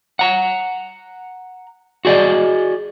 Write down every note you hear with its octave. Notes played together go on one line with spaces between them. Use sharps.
F#5 A#5
F#4 G#4 D5 D#5